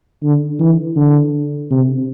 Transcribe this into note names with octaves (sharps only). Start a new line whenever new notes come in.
D3
E3
D3
C3